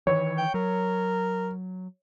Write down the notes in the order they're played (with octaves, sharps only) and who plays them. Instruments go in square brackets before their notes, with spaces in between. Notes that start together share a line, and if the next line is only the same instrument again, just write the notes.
[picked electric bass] D#3 E3 [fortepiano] C#5
[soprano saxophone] G5
[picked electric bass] F#3 [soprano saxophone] A#4